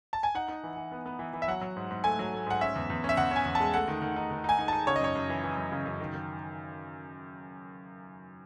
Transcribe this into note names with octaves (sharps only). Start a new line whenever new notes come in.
A5
G#5
D#4 F#5
D#4
E3
E3
B3
B3
E3
E3
E5
F#3 F#5
F#3
G#2
G#2
A3 G#5
F#3
A3
G#2 F#5
C#4 E5
E2
E2
C#4
E5
E2 F#5
C#4 G#5
E2
A5
G#3
A3 F#5
D#3
D#3
D#4
D#3
D#4 G#5
D#4
A5
D#4
C#3 C#5
D#5
F#2 C#5
F#2
E3
E3
F#2
C#3
F#2
D#3
D#3